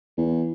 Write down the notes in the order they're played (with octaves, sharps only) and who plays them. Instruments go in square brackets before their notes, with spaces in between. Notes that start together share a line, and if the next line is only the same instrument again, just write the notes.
[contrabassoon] E2